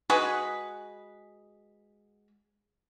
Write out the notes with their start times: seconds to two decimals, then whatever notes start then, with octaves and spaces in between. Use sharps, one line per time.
0.10 G#3 F#4 G#4 B4